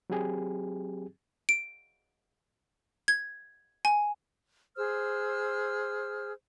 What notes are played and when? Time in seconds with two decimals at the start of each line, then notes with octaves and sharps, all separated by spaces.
0.10 F#3 C4 G4 G#4
1.49 D7
3.08 G#6
3.85 G#5
4.76 G#4 C5 E6 F6